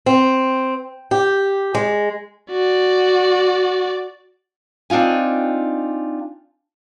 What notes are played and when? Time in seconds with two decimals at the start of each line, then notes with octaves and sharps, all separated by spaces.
0.06 C4
1.11 G4
1.75 G#3
2.51 F#4 D5
4.90 C4 D4 D#4 F4 G#5